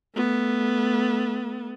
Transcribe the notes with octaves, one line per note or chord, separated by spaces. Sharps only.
A3 B3